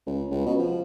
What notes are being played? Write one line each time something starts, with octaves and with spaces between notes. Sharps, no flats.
C#2
C#2
B2
F3